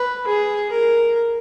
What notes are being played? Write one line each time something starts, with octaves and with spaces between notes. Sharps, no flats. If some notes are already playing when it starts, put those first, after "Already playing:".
Already playing: B4
G#4
A#4